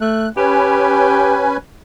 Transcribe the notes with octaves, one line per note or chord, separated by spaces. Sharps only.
A3 F#6
C#4 G4 B4 G#5